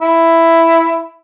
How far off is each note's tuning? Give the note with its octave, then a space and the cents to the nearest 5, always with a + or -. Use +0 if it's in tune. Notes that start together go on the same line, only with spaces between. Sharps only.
E4 +5